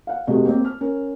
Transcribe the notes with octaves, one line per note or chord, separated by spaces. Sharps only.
F5 F#5
F1 C3 A3 F#4 G#4 D#5
A#3 C4
F6
C#4 A#4